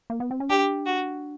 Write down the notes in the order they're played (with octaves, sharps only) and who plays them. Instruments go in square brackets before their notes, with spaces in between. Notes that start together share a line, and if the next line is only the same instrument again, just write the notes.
[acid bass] A#3
B3
C4
C#4
[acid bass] D4 [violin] G4
[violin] F#4